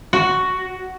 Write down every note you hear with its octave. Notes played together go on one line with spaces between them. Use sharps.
F#4